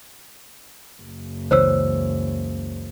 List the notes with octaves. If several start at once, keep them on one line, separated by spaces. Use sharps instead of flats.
F#1
C#2 E3 C5 C#5 E6